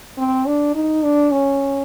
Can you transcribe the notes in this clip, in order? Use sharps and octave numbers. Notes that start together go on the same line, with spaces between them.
C4
D4
D#4
D4
C#4